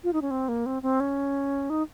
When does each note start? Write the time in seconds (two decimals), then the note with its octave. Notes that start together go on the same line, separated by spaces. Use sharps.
0.04 F4
0.13 D#4
0.22 C#4
0.31 C4
0.49 A#3
0.66 C4
0.83 C4
1.00 C#4
1.70 D#4